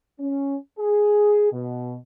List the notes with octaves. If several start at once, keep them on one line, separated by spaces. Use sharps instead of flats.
C#4
G#4
B2